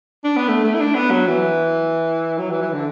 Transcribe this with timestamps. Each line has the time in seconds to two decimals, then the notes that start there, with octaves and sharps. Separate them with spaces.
0.24 D4
0.37 B3
0.48 A3
0.64 A3
0.75 E4
0.80 D4
0.95 B3
1.11 F#3
1.27 E3
2.38 F#3
2.50 E3
2.62 E3
2.73 D3